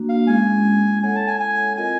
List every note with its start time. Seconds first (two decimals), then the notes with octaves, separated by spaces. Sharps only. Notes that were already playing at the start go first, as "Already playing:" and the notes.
Already playing: A#3 D4 F#4
0.09 F5
0.27 G#3 C#4 E4 G#4 G#5
1.02 E4 A4 C#5 F#5 G#5
1.15 A5
1.27 G#5
1.40 G#5
1.77 C4 F4 A#4 D#5 G#5